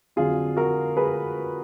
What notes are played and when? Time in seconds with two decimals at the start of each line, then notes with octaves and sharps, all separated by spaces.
0.16 F2 D3 F#3 F4 G#4
0.57 F#4 A#4
0.97 G#4 B4